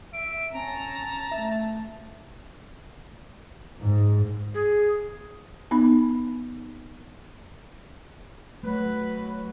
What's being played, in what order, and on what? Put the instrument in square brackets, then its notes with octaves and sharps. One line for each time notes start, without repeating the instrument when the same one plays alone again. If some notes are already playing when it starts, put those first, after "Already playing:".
[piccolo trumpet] E5 [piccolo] D7
[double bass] C#4 [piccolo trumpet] A5 [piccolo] A#5
[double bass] A3 [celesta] E5
[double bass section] G#2
[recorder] G#4
[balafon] B3 D#4 B5
[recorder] F#3 [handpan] A3 [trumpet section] B4